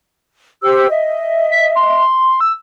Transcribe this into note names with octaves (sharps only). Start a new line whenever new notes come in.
G4 C5 E6
D#5 E5
B6
C6
E6